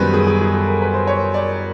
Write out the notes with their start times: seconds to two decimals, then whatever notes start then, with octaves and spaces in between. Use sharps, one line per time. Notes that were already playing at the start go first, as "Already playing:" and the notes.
Already playing: F#2 D#3 G3 B3 B4 C5
0.14 G#4
0.27 G#4
0.41 G#4
0.54 A4
0.67 A#4
0.82 B4
0.94 C5
1.07 C#5
1.34 D5